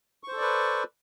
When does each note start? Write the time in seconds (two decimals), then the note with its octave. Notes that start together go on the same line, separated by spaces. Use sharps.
0.23 C#6
0.28 C5
0.32 A4
0.37 D5
0.41 B4